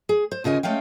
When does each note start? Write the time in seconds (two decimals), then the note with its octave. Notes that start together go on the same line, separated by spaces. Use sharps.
0.09 G#4
0.31 C5
0.44 D#2 C#3 F4 D#5 G#5
0.63 G#3 A3 C#4 F5 G5